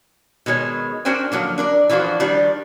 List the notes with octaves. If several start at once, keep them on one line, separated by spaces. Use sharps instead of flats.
B2 D#3 G#3 C#5
C#4 D4 F#4 A#4 C5 G5
D3 F3 F#3 A#3
D4 A#4 D5
E3 F3 D4 F4 F#4
D#3 F3 G3 D4